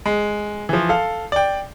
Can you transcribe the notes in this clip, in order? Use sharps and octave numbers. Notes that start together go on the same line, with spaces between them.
G#3
E3 F3
A4 F5
D5 G5